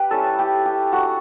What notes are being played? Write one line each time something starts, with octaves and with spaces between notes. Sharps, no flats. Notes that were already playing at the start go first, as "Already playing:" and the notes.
Already playing: G4 B4
G3 C#4 E4 A4
G4
G4
A3 D4 F#4